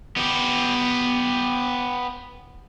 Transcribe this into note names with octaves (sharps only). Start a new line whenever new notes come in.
B3 G4